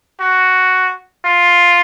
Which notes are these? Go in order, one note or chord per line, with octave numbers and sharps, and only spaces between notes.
F#4
F4